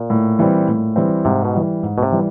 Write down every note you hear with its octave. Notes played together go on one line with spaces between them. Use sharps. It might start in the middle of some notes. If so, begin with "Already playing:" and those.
Already playing: A#2
A2
E3 G3 C4
A2
E3 G3 C4
G#2 C3
B2
E3 G3
G#2
B2
C3
E3 G3